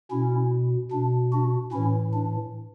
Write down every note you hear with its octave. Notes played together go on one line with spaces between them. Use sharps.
B2 C#4 E4
B2 D4
D4 F#4
A2 E3 C#4 E4
D4